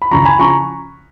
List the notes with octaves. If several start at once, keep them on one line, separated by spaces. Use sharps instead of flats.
B5
C#2 C#3 F3 A#5 C#6
G#5 B5
C#3 F3 A#5 C#6